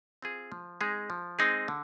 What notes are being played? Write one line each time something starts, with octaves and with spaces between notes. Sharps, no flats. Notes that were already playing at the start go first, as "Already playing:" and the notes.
C4 F4 G#4
F3
G#3 C4 D#4 G#4
F3
G#3 C4 D#4 G#4
D3